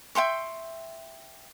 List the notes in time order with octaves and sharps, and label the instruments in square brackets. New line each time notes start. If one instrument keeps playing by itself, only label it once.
[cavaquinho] E5 G5 C6 C#6